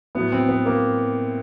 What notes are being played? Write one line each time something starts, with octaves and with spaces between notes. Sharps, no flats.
A2 F#3 B3
C4
B3
A#3